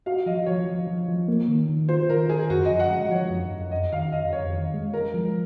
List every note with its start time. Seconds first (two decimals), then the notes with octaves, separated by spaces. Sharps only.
0.06 F#4 F5
0.26 F3 D#5
0.46 F3 C#5
0.67 F3
0.87 F3
1.08 F3
1.28 A#3
1.48 D#3
1.69 D#3
1.89 F4 C5
2.09 D#3 A#4
2.29 D#3 G#4
2.50 F#2 F#4
2.65 F3 D#5
2.80 F#5
2.91 G#3 D#5
3.11 F3 C#5
3.30 F#2
3.51 F#2
3.71 F2 D#5
3.92 D#3 F5
4.12 F2 D#5
4.33 F2 C#5
4.53 D#3
4.74 G#3
4.93 G#3 A#4
5.14 F3